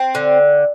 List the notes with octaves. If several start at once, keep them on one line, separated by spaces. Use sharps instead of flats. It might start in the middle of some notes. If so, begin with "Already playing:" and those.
Already playing: C4
D3